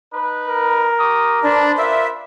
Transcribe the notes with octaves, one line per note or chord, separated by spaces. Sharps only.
D#4 B4
A#4
G4 C#6 D#6
D4 B4 C5 D5
F4 A#4 E5